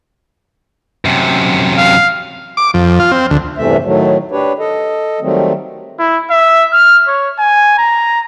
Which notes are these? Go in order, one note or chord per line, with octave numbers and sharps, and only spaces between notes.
F#2 C3
F5
D6
F2
F4
C4
D2
E2 G2 C3 E3 A3 E5
A2 D#3 F#3 A3
D4 G4 B4 C#5
A4 D#5
D#3 F#3 G3 A3 C4
E4
E5
F6
C#5
G#5
A#5